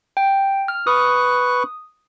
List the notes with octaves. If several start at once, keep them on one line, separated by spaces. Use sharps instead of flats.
G5
F6
B4 C#6 D#6 F#6